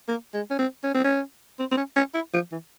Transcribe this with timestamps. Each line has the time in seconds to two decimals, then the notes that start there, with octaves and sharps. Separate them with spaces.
0.08 A#3
0.34 G#3
0.50 C#4
0.59 C4
0.84 C#4
0.94 C4
1.04 C#4
1.59 C4
1.71 C4
1.77 C#4
1.96 C#4
2.14 E4
2.34 F3
2.52 E3